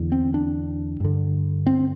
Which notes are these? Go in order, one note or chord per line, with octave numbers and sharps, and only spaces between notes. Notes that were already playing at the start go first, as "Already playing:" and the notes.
Already playing: E2 D3
C4
D4
G2 D3
C4